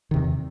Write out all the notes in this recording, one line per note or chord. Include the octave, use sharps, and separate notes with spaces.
E2 C3 D#3